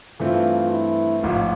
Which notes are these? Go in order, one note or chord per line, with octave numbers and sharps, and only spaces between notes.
G2 E3 A3 C4 F4
E4
A1 G#2 F3 F4